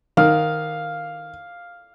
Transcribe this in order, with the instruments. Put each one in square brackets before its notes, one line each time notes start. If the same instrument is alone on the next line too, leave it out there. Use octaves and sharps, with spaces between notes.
[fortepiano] D#3 [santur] F5